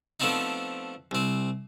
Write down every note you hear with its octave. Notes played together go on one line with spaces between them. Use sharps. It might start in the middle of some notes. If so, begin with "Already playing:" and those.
F3 A3 B3 C4 D4 D#4
C2 C4